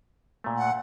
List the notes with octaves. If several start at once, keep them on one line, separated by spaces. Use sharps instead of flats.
A#2 A3
F#5